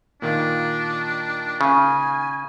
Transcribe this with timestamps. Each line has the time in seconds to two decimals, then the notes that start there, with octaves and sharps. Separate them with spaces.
0.22 A#2 D#3 D4 F4
1.61 C#3 G#5